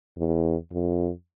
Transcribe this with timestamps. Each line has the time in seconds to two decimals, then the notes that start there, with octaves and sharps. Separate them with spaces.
0.18 E2
0.72 F2